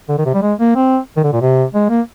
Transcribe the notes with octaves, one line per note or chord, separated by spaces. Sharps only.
D3
D#3
C3
G3
G#3
A#3
C4
D#3
D3
A#2
C3
G#3
A#3